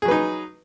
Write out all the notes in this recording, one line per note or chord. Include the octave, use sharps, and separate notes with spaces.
F#3 D#4 G#4 B4